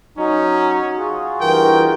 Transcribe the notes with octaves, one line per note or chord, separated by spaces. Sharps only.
F#3 C#4 D#4
F4 F#4 G#4
G2 E3 A#4 G5